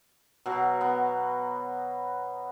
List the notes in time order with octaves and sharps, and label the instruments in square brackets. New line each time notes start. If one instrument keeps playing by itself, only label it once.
[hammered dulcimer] B2 F#3
B3